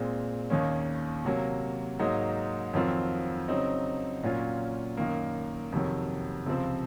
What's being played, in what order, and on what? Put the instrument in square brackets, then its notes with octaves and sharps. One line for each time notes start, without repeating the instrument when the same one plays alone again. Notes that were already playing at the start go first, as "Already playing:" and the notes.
Already playing: [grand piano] A#2 G#3 C4
D#2 D#3 A#3 C#4
C3 F#3 A#3
G#2 F#3 A#3 D#4
F2 D#3 F#3 C4 F4
C#3 F#3 C4 D#4
A#2 F#3 C#4 F4
F#2 D#3 A#3
F2 C3 D#3 F#3
C#2 C3 F3 C4